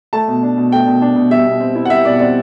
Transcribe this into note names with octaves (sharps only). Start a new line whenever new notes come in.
A3 A5
B2
D4
B2
A3 G5
B2
D4
B2
G3 E5
B2
C4
E4
F#5
G3 E5
B2 D5
C4 D5